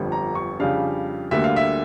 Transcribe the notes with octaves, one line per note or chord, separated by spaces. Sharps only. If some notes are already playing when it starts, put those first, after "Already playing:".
Already playing: G1 F2 D3 G3
A#5
C#6
F2 C#3 G3 D4 F5
D2 D3 G3 A#3 E5
F5
E5